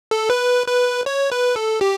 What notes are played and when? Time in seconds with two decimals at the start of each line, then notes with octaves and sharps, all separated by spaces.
0.11 A4
0.30 B4
0.67 B4
1.06 C#5
1.32 B4
1.56 A4
1.81 G4